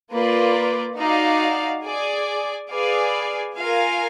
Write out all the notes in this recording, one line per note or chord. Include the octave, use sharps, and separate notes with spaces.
A#3 F4 B4 D5
D#4 F#4 D5 F5
G#4 D5 G#5
G#4 B4 D5 F5 G#5
F4 A#4 F5 G#5